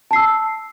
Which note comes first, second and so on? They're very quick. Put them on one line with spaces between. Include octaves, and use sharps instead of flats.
A5 C7 E6